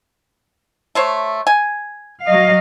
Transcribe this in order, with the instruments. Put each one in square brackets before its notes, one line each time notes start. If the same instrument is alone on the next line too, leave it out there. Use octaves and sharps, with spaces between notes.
[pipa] A3 C5 C#5
G#5
[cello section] F#3 D#5 F5